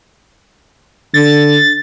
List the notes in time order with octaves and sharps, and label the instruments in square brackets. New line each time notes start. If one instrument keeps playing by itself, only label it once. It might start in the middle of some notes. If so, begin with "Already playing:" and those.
[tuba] D3 [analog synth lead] A6